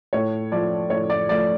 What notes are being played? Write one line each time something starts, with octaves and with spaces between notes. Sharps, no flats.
A2 C#5
F3 A3 D5
A2 C#5
D5
F3 A3 D5